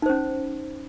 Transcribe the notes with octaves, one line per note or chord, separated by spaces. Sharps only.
C#4 D#4 C5